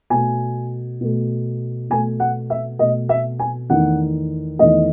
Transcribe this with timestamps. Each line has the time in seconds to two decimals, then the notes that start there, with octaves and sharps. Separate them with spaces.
0.10 B2 A3 G#5
1.01 B2 A3
1.90 B2 A3 G#5
2.20 F#5
2.50 E5
2.79 B2 A3 D#5
3.09 E5
3.39 G#5
3.70 E2 D#3 A3 F#5
4.59 E2 D#3 A3 D#5